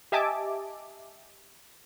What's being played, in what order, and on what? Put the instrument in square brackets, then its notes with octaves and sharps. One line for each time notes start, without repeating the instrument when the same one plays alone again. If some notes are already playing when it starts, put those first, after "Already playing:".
[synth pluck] G4 D#5 E5 G#5 A5 D6